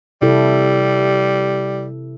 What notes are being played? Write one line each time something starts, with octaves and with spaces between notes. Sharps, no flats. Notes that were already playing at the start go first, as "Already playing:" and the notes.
C3 G3 E4 A4